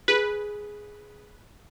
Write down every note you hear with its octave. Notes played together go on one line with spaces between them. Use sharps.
G#4 B4